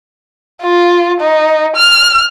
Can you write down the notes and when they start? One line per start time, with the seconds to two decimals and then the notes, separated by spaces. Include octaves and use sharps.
0.62 F4
1.20 D#4
1.76 F6